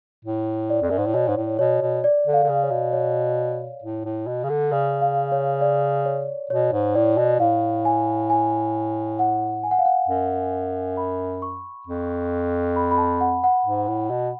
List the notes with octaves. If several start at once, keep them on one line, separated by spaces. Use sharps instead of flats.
A2
D5
F2
F#2
G#2
A2
B2 C#5
G#2
A2
B2 C#5
B2
D5
D3
F5
D3
C#3
C#5
B2
C#5
A2
A2
B2
C#3
D3
C#3 D5
F5
C#5
D5
C#5
B2 C#5
G#2
A2 D5
B2
A2 F5
G#5
G#5
F#5
G#5
F#5
F5
F#5
F#2
B5
C#6
F2
B5
B5
A5
F#5
F#5
G#2
A2
B2